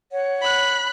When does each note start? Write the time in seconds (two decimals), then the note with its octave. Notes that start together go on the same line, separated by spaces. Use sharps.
0.11 C#5 F#5
0.41 B5 F#6